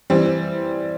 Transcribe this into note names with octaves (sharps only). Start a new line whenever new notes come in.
E3 G3 C4